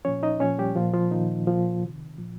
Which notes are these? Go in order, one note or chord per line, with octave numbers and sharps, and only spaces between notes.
A#2 F3 C#4 C#5
D#4 D#5
A#2 F3 C#4 C#5
G3 G4
A#2 F3 F4
F3 F4
A#2 D#3 F3 D#4
A#2 F3 F4
C3 D#3
A#2 F3